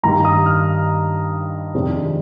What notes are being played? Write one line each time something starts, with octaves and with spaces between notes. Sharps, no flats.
G2 D#3 G3 A#3 A#5
D#6
F6
F2 C3 D#3 G#3 D4